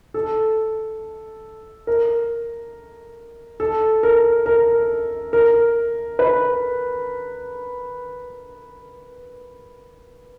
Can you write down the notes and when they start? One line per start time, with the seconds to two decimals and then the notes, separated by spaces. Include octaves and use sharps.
0.14 A4
1.87 A#4
3.60 A4
4.03 A#4
4.46 A#4
5.33 A#4
6.19 B4